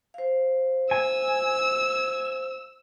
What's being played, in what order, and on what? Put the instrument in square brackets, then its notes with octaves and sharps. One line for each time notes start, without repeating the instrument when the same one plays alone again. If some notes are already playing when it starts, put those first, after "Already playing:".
[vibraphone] C5 F5
[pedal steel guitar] G#5 [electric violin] E6